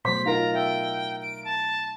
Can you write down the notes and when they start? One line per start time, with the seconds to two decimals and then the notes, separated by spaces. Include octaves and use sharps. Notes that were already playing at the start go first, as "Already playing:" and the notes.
0.05 B2 F#3 A3 C5 C6 B6
0.26 D#4 F4 A#4 F5 A#5
0.54 E5 G5
1.22 D7
1.45 A5